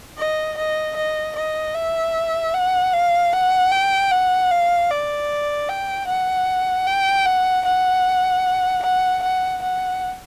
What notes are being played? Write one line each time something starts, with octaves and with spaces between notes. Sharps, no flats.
D#5
D#5
D#5
D#5
E5
F#5
F5
F#5
G5
F#5
F5
D5
G5
F#5
G5
F#5
F#5
F#5
F#5
F#5